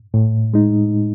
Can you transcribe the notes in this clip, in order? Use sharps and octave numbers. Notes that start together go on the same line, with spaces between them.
A2
G#3 D#4